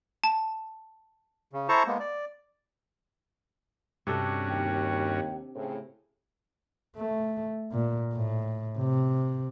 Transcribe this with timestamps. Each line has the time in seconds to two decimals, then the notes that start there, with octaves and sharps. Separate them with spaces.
0.24 A5
1.52 C#3
1.69 E4 A4 C5 A5 A#5 C#6
1.87 G#3 A#3 B3
2.00 D5
4.07 G2 C3 C#4 D4 F#4 A4
4.49 D#2 G5
5.55 A2 C#3 C4
6.97 A3
7.72 A#2
8.13 A2
8.78 C3